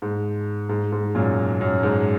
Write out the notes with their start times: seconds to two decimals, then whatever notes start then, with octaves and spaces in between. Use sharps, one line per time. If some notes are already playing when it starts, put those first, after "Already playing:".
0.02 G#2
0.69 G#2
0.92 G#2
1.15 F#2 A#2
1.61 F#2
1.83 G#2